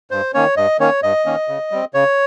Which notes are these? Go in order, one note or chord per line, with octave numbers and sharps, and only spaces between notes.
G2 C5
D#3 A#3 C#4 C#5
G2 D#5
D#3 A#3 C#4 C#5
G2 D#5
D#3 A#3 C#4
C#3
G3 C4
C#3 C#5